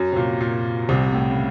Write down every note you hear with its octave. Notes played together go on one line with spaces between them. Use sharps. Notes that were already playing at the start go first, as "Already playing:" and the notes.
Already playing: F#2 F#3
C3
A#2
A#2
C2 C3
A2
C#3